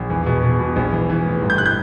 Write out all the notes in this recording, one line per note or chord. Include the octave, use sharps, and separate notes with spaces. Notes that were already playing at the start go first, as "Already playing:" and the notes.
Already playing: A#1
E2
B2
B2
B2
A#1
E3
E3
A2
G1
G6
F#6
G6